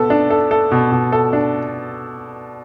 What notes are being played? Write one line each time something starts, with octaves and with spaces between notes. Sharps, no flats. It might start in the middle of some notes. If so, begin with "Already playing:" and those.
Already playing: B2 B3 A4
D4
A4
A4
B2
B2
A4
D4